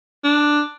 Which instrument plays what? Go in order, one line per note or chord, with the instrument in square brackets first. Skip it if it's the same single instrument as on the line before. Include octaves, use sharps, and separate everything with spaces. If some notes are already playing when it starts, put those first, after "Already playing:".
[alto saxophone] D4